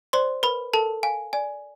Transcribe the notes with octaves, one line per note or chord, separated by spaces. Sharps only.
C5 D5 C6
A#4 B4 B5
A4 A#4 A5
F5 G#5
D5 G#5